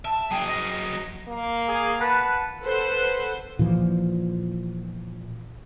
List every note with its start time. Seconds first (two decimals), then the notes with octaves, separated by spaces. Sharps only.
0.05 E5 A5
0.31 F#3 G#4 G5
0.47 D#5
1.28 A#3
1.68 G#4
1.99 B4 F#5 A5
2.61 A4 B4 C5 F#5
3.59 A#2 E3 F3